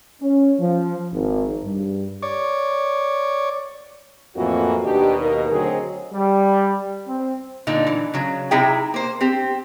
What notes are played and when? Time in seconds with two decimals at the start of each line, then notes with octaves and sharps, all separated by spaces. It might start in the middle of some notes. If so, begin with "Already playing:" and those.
0.21 C#4
0.60 F3
1.12 G#1
1.63 G2
2.22 C#5 D5
4.36 F2 A2 E3 A#3 F#4
4.83 D#2 B2 D4 D#4 G4
5.20 A#3 D#4 A#4
5.51 D2 F#3 C4 G#4 D#5
6.13 G3
7.07 C4
7.67 A#2 D3 D#4
7.87 E3
8.14 C#3 F#3
8.51 C3 D#4 E4 G#4 E5 G5
8.94 A#3 C5
9.21 C4 G4